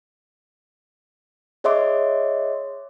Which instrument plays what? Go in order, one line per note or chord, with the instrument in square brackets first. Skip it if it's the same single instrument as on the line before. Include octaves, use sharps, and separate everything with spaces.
[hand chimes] G#4 C#5 D#5 E5 C6 D6